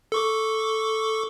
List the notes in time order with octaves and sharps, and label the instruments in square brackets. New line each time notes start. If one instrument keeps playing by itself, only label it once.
[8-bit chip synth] A4 C#6 D6